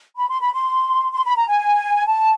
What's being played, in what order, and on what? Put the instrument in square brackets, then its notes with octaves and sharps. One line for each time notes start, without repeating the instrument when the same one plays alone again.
[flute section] B5
C6
B5
C6
C6
B5
A#5
G#5
A5